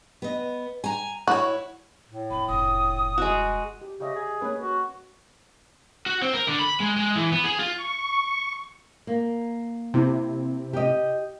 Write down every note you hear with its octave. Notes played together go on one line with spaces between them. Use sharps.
B3 D#5
G#5 A#5
E4 F#4 C#5
A2
F1 B5
F1 G2 D#6
G#3 F#4
G4
C#3 G4 D#5 E5
G#4
A#3 C#4 B4
F#4
F#4
C4
A#4
D3
B5
G#3
G#3
E3
B3
G#4
F4
C#6
A#3
C3 C4 E4
G4 D#5